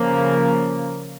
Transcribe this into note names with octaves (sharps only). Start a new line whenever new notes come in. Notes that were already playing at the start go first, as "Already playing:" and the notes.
Already playing: C#3 F3 A#3